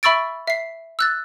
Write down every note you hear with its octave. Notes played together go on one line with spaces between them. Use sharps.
E5 B5 C#6 E6 A6 D7
E5 C7
E6 F#6 A6